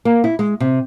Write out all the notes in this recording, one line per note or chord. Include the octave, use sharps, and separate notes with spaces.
A#3
E4
G#3
C3